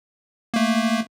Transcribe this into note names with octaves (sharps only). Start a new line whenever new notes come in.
A3 A#3